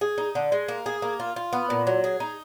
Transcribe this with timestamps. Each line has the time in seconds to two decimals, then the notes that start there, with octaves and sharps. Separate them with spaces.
0.01 G#4
0.18 D#4
0.35 D3
0.52 G#3
0.68 A#3
0.86 G#4
1.02 A#3
1.20 F4
1.36 F4
1.53 B3
1.70 A#2
1.87 F#3
2.04 G#4
2.20 D#4